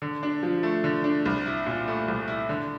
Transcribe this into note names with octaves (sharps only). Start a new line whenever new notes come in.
D3
D4
F3
A3
D3
D4
C2
E4
A#2
A3
C2
E4
D3